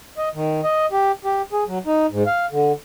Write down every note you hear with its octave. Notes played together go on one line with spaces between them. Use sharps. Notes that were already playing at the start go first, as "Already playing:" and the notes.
D#5
D#3
D#5
G4
G4
G#4
F#3
D#4
G#2
F5
D3